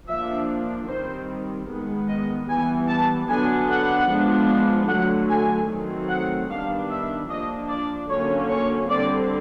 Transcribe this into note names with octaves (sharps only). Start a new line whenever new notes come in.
F3 A#3 D4 E5
D#3 G3 C4 C5
D#3 G#3 B3
D#5
E3 G3 B3 G#5
A5
D3 F#3 B3 D4 G#5
F#5
F3 G#3 B3 D4
D3 F#3 A3 F#5
G#5
D#3 F#3 A3 C4
F#5
D#3 G3 B3 D4 F5
E5
F3 A#3 D4 D#5
D5
D3 F#3 A#3 C#4 C#5
C#5
D3 G3 C4 D5